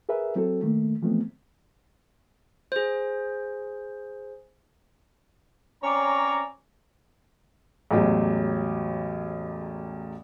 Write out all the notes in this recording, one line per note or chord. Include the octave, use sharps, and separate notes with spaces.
G#4 A#4 B4 E5
F#3 C4 E4 F#4 A4
D#3 A3 A#3
E3 F3 G#3 A3 B3 C4
G#4 C5
C4 C#4 C#5 D5 A#5
A1 E2 F#3 G#3 G4